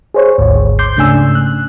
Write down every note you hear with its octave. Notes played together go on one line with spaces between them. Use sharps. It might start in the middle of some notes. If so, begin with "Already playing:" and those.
G#4 C5 C#5
G#1 D2 G#2
C6 D6 G6 C7
G#2 C#3 A3 D4 G#5 E6
F#6